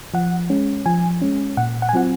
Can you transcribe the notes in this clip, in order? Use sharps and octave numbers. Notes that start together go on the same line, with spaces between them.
F3 F#5
G#3 C#4
F3 G#5
G#3 C#4
A#2 F#5
F#5
G#5
F#3 C4 F4 F#5